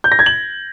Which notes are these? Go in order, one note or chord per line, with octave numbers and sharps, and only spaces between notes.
G6
A#6
G#6
F#7